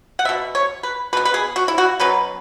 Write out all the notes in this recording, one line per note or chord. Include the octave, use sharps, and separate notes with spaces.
F#5
B3 E5
B2
C#5
B4
B2 B3 B4
B4
G#4
F#4
E4
F#4
B2 F#3 C#4 B4